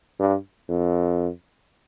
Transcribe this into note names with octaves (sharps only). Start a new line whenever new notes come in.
G2
F2